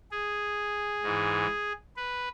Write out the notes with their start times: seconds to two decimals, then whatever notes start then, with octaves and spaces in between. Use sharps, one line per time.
0.11 G#4
1.03 G#2 E3
1.96 B4